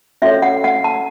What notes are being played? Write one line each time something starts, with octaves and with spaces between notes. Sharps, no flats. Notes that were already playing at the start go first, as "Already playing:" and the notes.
C#4 F#4 A4 C#5 E5
F#5
F#5
A5